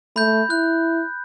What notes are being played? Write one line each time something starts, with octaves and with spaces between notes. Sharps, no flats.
A3 B5 G6
E4 F#6